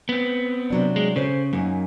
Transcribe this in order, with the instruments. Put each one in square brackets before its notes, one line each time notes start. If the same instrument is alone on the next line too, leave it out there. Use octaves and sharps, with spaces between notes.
[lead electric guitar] B3 C4
[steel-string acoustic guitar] C3 F#3 D4
[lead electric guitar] G#3
[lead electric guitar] C#3 [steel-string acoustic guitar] A4 C5 C#5
[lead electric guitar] F#2 [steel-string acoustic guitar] A#3 C#4 D#4